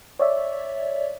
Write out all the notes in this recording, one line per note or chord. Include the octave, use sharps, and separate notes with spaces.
C#5 D5 E5